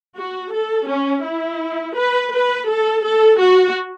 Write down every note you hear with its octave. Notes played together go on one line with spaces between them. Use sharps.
F#4
A4
C#4
E4
B4
B4
A4
A4
F#4